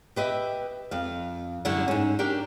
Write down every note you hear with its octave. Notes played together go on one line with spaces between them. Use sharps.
G4 B4 D#5 E5
F2 F5
F#2 D3 G3 C#4 E4 F#5
G#2 C#4
D4 G4 A#4 G5